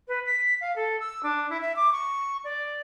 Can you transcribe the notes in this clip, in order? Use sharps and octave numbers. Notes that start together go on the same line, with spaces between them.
B4
B6
F5
A4
E6
D4
E4
E5
D6
C#6
D5